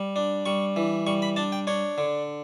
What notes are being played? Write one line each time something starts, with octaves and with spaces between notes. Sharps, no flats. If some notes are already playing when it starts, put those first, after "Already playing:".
Already playing: G3
D4
G3 C#6
E3
G3 C#6
B5
D4 A5
G5
D4 C#5
D3